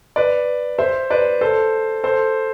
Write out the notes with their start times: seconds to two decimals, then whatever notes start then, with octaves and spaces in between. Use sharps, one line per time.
0.16 B4 D5
0.78 C5 E5
1.10 B4 D5
1.41 A4 C5
2.04 A4 C5